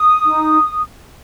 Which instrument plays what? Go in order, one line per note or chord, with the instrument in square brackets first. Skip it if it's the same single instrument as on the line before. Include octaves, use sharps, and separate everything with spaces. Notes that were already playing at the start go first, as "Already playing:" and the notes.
Already playing: [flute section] D#6
D#4